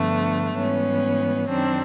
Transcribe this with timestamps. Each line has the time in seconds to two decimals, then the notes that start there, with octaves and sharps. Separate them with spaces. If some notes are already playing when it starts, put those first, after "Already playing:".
Already playing: G2 D3 F3 A3 B3
0.56 G#2 E3 G3 B3 C#4
1.49 F#2 D#3 F#3 C4 D4